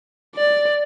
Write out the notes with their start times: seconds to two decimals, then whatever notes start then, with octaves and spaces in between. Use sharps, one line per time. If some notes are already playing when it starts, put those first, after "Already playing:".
0.36 D5